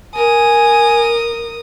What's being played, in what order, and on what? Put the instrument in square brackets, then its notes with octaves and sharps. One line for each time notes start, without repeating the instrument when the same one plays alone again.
[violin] A#4 D#6 [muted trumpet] G#5